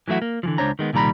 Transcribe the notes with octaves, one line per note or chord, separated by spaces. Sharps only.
E3 F#3 A3 E4 F#4
A#3
D3 E3 F3
C#2 C3 D4 C5 C#5 A#5
D#3 G#3 B3
C2 A#2 D#3 G3 A#5 B5